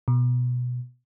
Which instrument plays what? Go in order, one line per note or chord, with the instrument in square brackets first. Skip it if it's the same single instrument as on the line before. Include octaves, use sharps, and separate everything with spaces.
[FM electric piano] B2